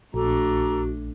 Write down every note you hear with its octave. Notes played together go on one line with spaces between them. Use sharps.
A#1 A3 D4 F#4 A4 A#5 D6